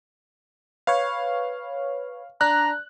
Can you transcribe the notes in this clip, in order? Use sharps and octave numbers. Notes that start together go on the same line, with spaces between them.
B4 C#5 F5
D4 A#5 F#6